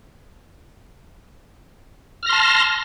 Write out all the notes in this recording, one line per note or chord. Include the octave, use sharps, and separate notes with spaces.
A5 C6 F6 A#6